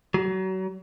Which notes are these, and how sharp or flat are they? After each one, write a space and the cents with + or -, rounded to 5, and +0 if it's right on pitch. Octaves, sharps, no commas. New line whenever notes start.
F#3 +30